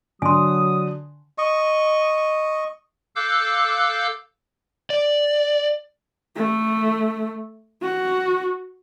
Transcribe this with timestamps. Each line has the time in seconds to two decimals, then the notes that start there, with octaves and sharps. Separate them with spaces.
0.22 D3 F#3 G#5 C6 D#6
1.38 D#5 C#6
3.16 A4 F5 D6 E6 F#6 G6
4.90 D5
6.36 A3
7.82 F#4